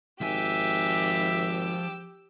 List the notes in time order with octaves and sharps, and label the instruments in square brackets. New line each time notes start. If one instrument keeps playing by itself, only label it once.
[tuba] G#1 [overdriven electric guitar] F3 G#5 [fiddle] G4 E6 [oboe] E5